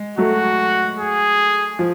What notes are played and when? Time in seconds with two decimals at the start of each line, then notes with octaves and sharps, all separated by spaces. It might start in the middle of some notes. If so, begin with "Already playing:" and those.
Already playing: G#3
0.18 F#3 A3 F#4
0.98 G#4
1.79 F3